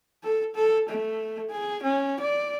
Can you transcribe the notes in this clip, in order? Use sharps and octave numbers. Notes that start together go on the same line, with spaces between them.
A4
A4
A3
G#4
C#4
D5